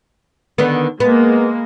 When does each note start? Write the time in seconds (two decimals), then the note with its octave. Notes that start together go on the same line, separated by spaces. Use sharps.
0.58 D3 D#3 B3
1.00 G#3 A#3 B3